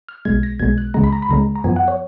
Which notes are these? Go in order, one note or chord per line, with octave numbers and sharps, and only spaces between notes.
F6
B1 B2 G#3 G#6
A#6
B1 B2 G#3 G#6
F#6
C#2 C#3 G#3 A#5
B5
A#5
B5
C#2 C#3 G#3 A#5
A#5
F#2 F3 B3 G#5
F#5
C#5